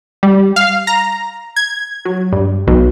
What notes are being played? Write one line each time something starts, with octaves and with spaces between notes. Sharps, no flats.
G3
F5
A#5
G#6
F#3
G2
B1